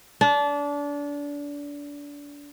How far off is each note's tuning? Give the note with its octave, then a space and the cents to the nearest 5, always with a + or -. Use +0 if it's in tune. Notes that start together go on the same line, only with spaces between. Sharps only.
D4 -25